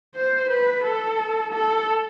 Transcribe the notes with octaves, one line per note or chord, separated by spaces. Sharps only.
C5
B4
A4
A4